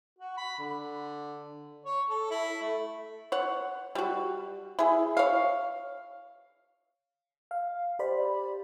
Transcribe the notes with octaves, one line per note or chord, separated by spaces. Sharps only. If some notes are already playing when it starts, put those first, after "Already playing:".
F#4
B5
D3
C#5
A4
E4
A3
C#5 F#5
G3 F#4
E4 G#4
C#5 F5
F5
G4 C5 D5 B5